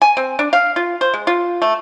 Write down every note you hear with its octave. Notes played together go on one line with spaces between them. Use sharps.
G#5
C4
D4
F5
F4
C5
G#3
F4
A3